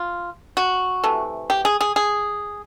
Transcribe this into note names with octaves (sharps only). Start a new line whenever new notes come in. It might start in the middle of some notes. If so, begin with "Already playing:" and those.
Already playing: F4
F#4
C3 E3 A3
G4
G#4
G#4
G#4